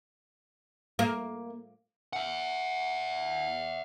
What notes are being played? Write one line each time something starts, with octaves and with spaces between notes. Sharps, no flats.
A#3
E5 F#5